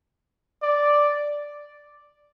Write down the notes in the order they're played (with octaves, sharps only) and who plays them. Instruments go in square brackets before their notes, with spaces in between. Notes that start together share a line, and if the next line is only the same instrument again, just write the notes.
[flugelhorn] D5